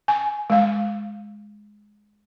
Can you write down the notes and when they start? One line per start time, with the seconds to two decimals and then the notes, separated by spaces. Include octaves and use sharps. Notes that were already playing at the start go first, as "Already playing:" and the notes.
0.08 G#5
0.50 G#3 F5